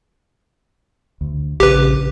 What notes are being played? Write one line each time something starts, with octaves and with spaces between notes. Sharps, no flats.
D2
A#1 C#3 G4 B4